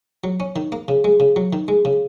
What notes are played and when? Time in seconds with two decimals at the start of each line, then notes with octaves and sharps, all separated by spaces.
0.24 F#3
0.40 C#4
0.56 D#3
0.72 A#3
0.88 C#3
1.04 G#3
1.20 C#3
1.36 F#3
1.53 D#3
1.68 G#3
1.85 C#3